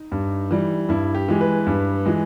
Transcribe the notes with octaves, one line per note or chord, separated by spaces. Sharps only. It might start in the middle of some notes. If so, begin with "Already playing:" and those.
Already playing: D#4
G2
E3 G3
G2 E4
G4
E3 G#3
B4
G2
E3 G#3